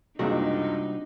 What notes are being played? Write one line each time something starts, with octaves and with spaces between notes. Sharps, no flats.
F#1 C#2 C3 G3 D4 D#4 F#4